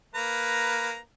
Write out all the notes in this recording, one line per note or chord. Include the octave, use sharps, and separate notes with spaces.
A#3 B4 A#5